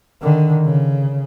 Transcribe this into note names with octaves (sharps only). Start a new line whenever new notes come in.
D3 D#3
C#3